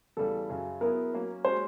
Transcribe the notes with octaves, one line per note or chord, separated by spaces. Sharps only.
E2 C#3 E3 G3 A4
F#2 C#3 F#3
F#3 B3 E4 G#4 A#4
F#3 A#3 C#4
G#3 C#4 F#4 C5